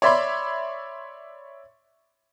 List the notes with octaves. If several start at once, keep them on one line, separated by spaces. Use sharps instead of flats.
C#5 D5 E5 B5 C6 D6